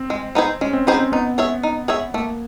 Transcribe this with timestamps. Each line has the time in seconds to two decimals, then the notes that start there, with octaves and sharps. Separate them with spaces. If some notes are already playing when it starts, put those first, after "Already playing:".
Already playing: C4
0.10 G#3
0.35 B3 D#4 G#4 C5
0.61 G#3 C#4
0.73 C4
0.87 B3 C#4 D#4 G#4 C5
1.00 C4
1.12 B3 D#4
1.38 G#4 C#5 E5
1.63 D#4
1.88 G#4 C#5 E5
2.14 A3 A#3